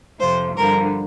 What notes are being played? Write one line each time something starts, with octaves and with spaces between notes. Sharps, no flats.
F2 C3 F3 C5
G2 D3 F3 A#4